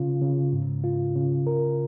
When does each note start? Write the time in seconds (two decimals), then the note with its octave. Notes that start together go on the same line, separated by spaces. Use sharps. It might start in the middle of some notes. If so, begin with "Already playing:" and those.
Already playing: C#3 F4
0.21 C#3
0.53 G#2
0.84 F4
1.16 C#3
1.47 A#4